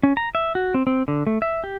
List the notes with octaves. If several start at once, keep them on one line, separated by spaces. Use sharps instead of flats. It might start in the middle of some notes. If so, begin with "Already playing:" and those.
C#4
A#5
E5
F#4
C4
C4
D3
A3
E5
G4